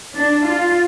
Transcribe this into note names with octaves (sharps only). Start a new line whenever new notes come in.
D4
F4